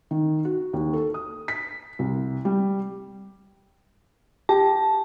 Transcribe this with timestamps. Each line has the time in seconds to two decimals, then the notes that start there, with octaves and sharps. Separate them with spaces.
0.11 D#3
0.45 F#4
0.73 D#2
0.93 A4
1.14 D#6
1.48 B6
1.99 C2
2.45 G3
4.49 G4 A5